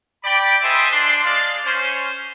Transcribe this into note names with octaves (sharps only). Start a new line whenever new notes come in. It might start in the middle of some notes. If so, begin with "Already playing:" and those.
D5 G5 B5
G4 A4 C5 D#5 E5 G#5
D4 C6
G#3 D5 F5
C#4 C5